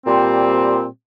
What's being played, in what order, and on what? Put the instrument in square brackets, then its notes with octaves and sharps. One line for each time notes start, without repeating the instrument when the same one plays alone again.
[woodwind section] A#2 G3 C4